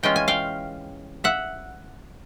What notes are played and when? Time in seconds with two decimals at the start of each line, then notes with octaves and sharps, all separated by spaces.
0.03 E3 G#3 C#4 F4 G5
0.16 G#5
0.28 F5 G5
1.24 E5 F#5